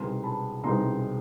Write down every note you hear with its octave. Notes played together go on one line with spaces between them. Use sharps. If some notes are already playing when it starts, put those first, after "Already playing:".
Already playing: C2 B2 G#3 C4 D#4 A#5 C6
A5 B5
C2 B2 G#3 C4 D#4 A#5 C6